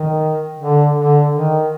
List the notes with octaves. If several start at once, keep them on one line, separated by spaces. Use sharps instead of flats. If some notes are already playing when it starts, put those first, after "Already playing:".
Already playing: D#3
D3
D3
D#3